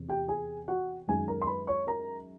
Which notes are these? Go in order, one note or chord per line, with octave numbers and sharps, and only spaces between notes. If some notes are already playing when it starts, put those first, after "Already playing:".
Already playing: E2 C3
G4 G5
G#4 G#5
F#4 F#5
F#2 D#3 G#3 G#4 G#5
A#4 A#5
C6
B4 B5
C#5 C#6
A#4 A#5